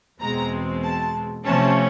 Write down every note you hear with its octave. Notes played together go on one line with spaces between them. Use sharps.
E2 B2 G#3 C4 A#5
A5
C3 F3 A3 C#4 A5